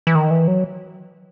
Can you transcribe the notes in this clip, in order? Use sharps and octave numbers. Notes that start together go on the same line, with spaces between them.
E3
D#3
E3
F#3